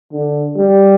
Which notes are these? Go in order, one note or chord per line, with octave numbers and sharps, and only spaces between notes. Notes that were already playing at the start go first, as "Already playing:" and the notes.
D3
G3